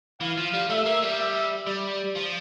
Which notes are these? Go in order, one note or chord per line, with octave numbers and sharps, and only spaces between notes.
E3 F5
F3
G3
A3 E5
A#3
G3
E5
G3 D5
F3